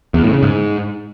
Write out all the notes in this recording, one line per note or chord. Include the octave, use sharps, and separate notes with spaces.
E2
A2
C#3
G#2